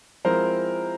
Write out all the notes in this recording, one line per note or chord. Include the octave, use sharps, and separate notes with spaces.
F3 G#3 C4 E4 A#4 C5